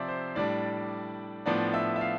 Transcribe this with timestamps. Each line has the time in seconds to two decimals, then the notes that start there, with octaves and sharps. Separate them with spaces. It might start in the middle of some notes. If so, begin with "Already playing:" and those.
Already playing: C3 F3 C4 D5 E5
0.09 C5
0.35 A2 G3 D4 D5
1.46 A2 F3 B3 D4 D5
1.74 E5
1.96 E5
2.01 F5